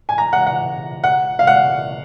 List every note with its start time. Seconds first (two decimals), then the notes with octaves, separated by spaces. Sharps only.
0.09 G#5
0.18 A#5
0.33 F#5
0.47 F#5
1.04 F#5
1.39 F5
1.47 F#5